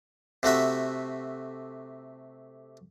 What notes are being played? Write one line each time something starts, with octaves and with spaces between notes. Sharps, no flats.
C3 A3 F#4 E5